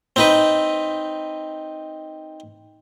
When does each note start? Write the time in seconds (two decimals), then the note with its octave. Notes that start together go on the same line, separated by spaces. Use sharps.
0.16 C4 D#4 B4